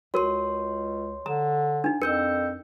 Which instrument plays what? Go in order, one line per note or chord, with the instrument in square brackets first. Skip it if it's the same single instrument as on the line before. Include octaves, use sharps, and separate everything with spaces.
[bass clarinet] C#2 [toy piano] F#4 A#4 [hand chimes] C#5 C6
[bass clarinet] D3 [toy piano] A#5
[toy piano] D4 D#4
[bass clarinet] F2 [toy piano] A#4 [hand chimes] E6 G6 C#7